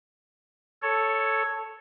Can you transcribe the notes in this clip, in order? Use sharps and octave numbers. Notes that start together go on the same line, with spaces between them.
A4 C#5